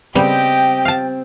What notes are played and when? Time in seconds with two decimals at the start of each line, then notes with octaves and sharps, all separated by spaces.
0.15 C#3 G3 B3 C4 G4 D#5 G5
0.85 F5 A5